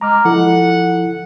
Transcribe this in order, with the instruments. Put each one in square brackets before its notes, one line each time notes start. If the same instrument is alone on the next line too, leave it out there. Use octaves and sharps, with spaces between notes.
[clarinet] G#3 [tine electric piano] A#5 D6 F6
[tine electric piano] F3 E4 A4 [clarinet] F#5